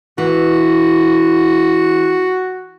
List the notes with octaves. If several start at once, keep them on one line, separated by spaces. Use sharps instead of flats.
E3 F#4